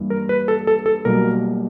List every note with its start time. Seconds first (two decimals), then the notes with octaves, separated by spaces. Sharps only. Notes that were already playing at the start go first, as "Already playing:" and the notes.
Already playing: G2 E3 G3 A#3
0.10 A#4
0.29 B4
0.48 A4
0.67 A4
0.86 A4
1.05 B1 B2 G3 A#3 A#4